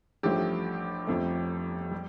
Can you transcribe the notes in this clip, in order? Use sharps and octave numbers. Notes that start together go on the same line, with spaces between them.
A1 G2 F3 A3 G4
G1 F2 F3 A3
G3